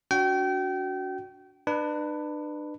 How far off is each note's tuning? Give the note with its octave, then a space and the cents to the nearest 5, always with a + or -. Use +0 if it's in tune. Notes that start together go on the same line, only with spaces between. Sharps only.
D4 -30 F#4 +0 G5 -30
D4 +35 B4 +0